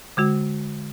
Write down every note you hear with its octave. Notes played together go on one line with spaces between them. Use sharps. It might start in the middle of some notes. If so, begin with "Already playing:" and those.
D3 G#3 F#4